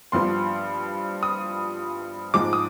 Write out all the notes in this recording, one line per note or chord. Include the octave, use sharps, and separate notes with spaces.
G2 F3 B3 C6
D#6
G#2 F3 G#3 D6
D#6